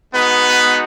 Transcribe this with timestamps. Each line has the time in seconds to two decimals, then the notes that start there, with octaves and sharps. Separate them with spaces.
0.14 G#3 B3 D#4 F#4 B4